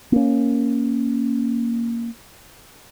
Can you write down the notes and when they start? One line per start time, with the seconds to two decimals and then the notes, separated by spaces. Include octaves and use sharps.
0.12 A#3 C#4